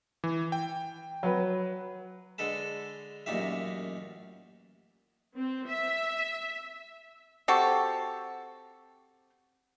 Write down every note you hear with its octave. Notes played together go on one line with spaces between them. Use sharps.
E3
G5
F#3 B4
D3 G#3 A4 B4 A5
A1 F#2 A#2 D#4 G4 E5
C4
E5
C4 F#4 G4 A4